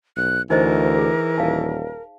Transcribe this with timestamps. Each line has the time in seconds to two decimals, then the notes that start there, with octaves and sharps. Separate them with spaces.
0.17 B1 F#6
0.50 D2 E3 D#4 A#4 C5 D#5
0.98 G#4
1.38 D#1 F5 A5